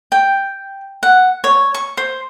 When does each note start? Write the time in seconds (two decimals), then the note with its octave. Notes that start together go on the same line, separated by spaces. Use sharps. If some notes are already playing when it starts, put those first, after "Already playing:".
0.12 G5
1.03 F#5
1.44 C#5
1.74 C#6
1.97 C5